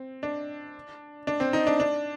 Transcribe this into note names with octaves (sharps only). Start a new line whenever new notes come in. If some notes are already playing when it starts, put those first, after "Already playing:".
Already playing: C4
D4
D4
C4
D#4
D4
D4